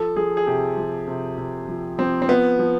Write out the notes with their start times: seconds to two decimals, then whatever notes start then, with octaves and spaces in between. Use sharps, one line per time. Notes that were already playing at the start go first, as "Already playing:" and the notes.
Already playing: F3 A4
0.16 F3 G#4
0.37 G#4
0.47 C3 G4
0.77 F3
1.07 C3
1.38 C3
1.68 F3
1.98 F3 C4
2.22 C4
2.28 F3 B3
2.59 F3